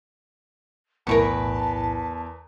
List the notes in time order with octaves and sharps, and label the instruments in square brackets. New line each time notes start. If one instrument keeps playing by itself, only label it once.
[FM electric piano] B1 A2 E4 [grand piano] E2 [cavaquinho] A#4 B4 C#6 [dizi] A5